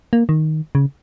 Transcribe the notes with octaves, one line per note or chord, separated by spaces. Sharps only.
A#3
D#3
C#3